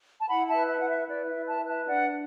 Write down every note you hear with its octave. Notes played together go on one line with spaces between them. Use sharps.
A5
E4 F#5 B5
E5 A5
B4
E5
E4 F#5
E5
B4 D5
E5
E4
E5 A5
B4
E5 A5
D4 D5 F#5